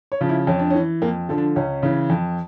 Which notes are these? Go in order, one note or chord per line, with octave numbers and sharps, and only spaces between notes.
C#5
C#3 F3
E4
F2 C#4
D4
E3 C#4
F2 A#3
D3 F3
D4
C#2 C#4
C#3 E3
F2